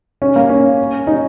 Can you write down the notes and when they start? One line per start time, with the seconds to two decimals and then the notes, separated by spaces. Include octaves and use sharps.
0.22 C#4
0.36 A#3
0.49 C#4
1.07 D#4